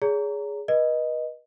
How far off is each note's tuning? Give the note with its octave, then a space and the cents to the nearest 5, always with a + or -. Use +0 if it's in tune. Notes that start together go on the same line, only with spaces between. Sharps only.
G#4 +0 C#5 +35 A#5 -10
B4 -30 D#5 +0